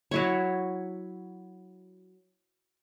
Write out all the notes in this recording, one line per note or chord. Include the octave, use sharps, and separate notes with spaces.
F#3 E4 C#5